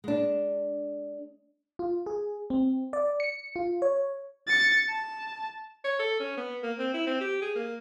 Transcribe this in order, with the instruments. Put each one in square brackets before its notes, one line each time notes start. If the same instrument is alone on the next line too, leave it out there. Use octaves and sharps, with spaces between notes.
[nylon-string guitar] G#3 D4
[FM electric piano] F4
G#4
C4
D5
C#7
F4
C#5
[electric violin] A6 C#7
A5
[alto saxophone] C#5
A4
C#4
B3
A#3
C4
E4
C4
G4
G#4
A#3